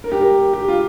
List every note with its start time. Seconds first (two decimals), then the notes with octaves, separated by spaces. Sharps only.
0.04 A#4
0.12 G4
0.21 A#4
0.53 G4
0.68 F4